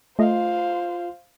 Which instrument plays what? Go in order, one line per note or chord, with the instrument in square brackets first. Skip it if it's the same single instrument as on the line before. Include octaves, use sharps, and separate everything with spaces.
[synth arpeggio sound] A3 D#5 [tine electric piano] F4 [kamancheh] C5 F5